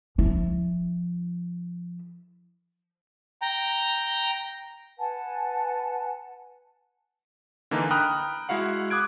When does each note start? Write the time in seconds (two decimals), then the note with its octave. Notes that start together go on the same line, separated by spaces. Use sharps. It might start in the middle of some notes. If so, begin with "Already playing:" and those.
0.18 F3 E4
3.42 G5 A#5
4.98 B4 F#5 G#5 A5
7.71 D3 E3 A#3 D4 D#4
7.91 G5 A#5 B5 D#6 F6 F#6
8.49 G#3 E4 F#4 F5 F#5
8.90 D6 D#6 F#6 G#6 D7